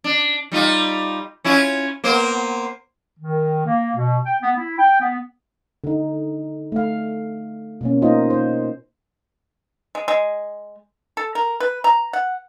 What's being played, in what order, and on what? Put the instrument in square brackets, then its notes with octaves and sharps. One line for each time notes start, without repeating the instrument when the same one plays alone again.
[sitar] D4
G3 D#4 F4
C#4 E4 F4
A#3 B3 C5
[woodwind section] D#3
A#3
B2
G5
B3
E4
G5
B3
[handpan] D3 D#4
A3 F5
B2 A#3 C#4
A#3 D#4 F4 C5 D#5
C5
[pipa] G#3
G#3
A4
A#4
B4
A#5
F#5